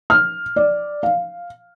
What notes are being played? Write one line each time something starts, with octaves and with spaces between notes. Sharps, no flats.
F6
D5
F5